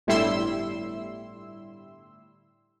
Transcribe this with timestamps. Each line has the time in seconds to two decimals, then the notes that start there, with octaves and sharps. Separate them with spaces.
0.07 G1 A2 G3 E4 C6 E6